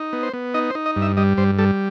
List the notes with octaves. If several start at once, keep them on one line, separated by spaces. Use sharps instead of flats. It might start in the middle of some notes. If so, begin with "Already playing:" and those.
Already playing: D#4
B3
C5
B3
D#4 D#5
C5
D#4
D#5
G2
E5
G3 D#5
G2 C5
G3 A4